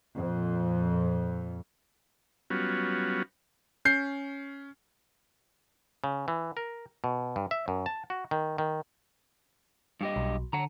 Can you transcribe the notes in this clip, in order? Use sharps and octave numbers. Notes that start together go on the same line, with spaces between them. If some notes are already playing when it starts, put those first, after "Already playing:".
F2 A#2
F#3 G3 B3 C#4 F4 F#4
C#4 G6 C7
C#3
E3
A#4
B2
G2
E5
F#2
A5
F#4
D#3
D#3
G2 G4 D#5
B1
D3 F#5 A#5